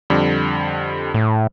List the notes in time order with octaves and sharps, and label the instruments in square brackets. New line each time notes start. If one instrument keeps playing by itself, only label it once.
[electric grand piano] F2 D3 G3
[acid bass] A2